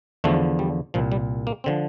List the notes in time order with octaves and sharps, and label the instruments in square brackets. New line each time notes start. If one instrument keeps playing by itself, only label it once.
[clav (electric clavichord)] E2 D3 F3 A3
G3
C2 A#2 F3
G3
A#3
D3 F3 C4